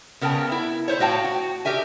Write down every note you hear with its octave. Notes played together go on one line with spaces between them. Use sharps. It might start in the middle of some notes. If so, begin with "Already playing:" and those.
C#3 B3 A#4 G5 A5
E4
E4 C5 C#5
A2 F#4 F5 G5 A5
F#4
G4 A#4 E5 G#5